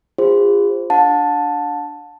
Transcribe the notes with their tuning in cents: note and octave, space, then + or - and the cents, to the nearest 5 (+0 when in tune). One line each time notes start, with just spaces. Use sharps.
F4 +0 G#4 -40 C5 +0
D4 +0 F#5 -45 A5 +0